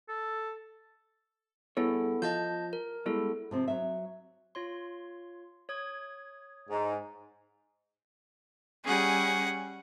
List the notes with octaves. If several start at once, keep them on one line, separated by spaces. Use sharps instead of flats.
A4
G2 B3 E4 G#4 A4 C#5
F3 F4 D#5 A5 G6
A#4
G3 G#3 B3 E4 A4
C3 F3 C4
F#3 E5
F4 C#5 C6
C#5 D#6 G#6
G#2
G3 C#4 G#4 F#5